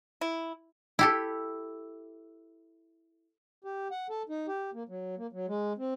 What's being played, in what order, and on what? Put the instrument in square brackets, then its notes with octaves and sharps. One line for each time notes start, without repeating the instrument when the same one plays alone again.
[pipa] E4
[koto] E4 G4 A4
[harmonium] G4
F#5
A4
D#4
G4
A#3
F#3
A#3
F#3
G#3
C4